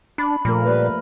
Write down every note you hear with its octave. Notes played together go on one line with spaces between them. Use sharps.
D4 B5
A#2 F3 A3 A#4
G3 A#3 B4